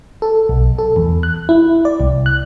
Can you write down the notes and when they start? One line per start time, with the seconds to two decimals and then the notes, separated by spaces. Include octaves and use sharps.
0.22 A4
0.49 B1
0.78 A4
0.96 E2
1.23 F#6
1.49 E4
1.85 D5
2.00 C2
2.26 F#6